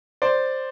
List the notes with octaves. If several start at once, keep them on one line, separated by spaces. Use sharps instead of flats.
C5 D5